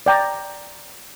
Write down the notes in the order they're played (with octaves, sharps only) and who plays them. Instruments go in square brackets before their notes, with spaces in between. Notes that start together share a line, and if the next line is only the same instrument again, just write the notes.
[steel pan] D5 G5 A#5